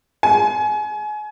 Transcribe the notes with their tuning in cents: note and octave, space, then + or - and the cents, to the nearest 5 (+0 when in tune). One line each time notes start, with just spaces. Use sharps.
G#5 +25